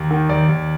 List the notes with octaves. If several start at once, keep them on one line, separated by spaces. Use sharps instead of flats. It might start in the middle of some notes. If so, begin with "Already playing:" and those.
Already playing: D#2
D#3
D#2 D5
D#2